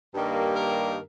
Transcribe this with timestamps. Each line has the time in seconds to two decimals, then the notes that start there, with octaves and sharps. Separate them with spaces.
0.13 G2 D#3 G3 A#3
0.55 A#4